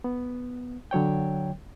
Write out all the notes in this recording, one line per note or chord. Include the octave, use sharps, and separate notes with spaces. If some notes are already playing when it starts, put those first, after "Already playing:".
B3
D3 F#3 C#5 G5